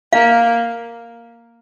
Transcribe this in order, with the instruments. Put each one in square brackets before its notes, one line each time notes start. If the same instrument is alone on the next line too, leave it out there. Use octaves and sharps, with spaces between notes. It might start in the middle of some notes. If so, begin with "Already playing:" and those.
[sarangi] A#3 [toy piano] F5